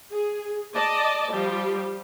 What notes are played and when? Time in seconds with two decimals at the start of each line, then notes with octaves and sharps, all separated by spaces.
0.12 G#4
0.74 D5 D#5 A5
1.31 F3 G3 G4